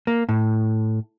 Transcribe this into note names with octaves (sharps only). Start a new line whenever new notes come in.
A#3
A2